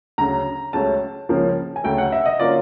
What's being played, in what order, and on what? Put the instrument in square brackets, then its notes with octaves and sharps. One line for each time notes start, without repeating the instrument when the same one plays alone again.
[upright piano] D2 C#3 F#3 A#5
C#2 C#3 F#3 A3 C#4 A5
C#2 C#3 F3 A#3 C#4
G#5
D2 C#3 F#3 A3 G5
F#5
E5
D#5
D3 F#3 A#3 C#4 F4 D5